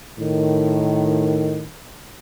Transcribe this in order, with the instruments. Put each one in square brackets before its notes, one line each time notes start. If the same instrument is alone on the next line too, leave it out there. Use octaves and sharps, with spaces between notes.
[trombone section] A2 D#3